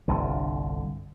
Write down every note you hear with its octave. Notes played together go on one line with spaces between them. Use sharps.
G1 C2 D3